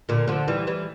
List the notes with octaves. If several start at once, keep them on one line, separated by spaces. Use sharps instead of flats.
A#2 D3
D3 F3
E3 G3
E3 G3